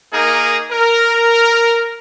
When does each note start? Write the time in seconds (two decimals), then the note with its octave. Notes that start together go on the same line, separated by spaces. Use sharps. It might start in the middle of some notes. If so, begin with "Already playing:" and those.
0.14 A#3 D#4 G#4 A#4
0.72 A#4